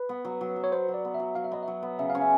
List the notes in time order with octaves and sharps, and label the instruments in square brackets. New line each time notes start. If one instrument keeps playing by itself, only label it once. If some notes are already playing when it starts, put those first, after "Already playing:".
Already playing: [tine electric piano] B4
[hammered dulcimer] B3
F#3
F#3
F#3
[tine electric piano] C#5
[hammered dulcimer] B3 [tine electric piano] C5
[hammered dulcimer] F#3
[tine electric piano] D5
[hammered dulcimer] B3
[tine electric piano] E5
[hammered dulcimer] F#3
[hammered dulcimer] F#3 [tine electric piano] F5
[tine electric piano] E5
[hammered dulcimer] B3 [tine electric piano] D#5
[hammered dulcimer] F#3 [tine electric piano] E5
[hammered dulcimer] B3
[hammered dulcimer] C#3 [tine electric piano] E5
[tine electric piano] F5
[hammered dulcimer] C#4
[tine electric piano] E5